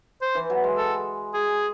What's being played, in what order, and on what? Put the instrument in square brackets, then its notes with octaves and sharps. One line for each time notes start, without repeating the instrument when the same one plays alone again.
[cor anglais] C5
[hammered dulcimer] E3
F#3
G#3
[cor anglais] A4
G#4